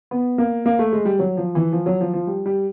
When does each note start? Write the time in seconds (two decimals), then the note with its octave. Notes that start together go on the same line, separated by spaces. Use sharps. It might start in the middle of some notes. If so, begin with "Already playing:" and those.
0.11 B3
0.38 A#3
0.66 A#3
0.79 A3
0.92 G#3
1.05 G3
1.19 F#3
1.37 F3
1.55 E3
1.72 F3
1.86 F#3
2.01 F3
2.13 F3
2.27 G3
2.46 G3